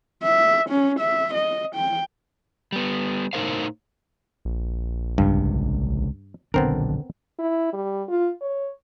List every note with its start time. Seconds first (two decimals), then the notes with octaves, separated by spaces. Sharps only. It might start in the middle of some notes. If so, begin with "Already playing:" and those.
0.23 E5
0.70 C#4
1.00 E5
1.34 D#5
1.75 G5
2.72 G3 B3
3.33 A2 D#4 F4 A#4 C5 F5
4.45 A#1
5.18 C#2 G2 C3
6.54 D#1 B1 D3 B3 C4 D4 A#4
7.39 E4
7.73 G3
8.09 F4
8.41 C#5